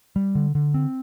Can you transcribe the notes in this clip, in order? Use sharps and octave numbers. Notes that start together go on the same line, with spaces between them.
G3
D3
D3
C4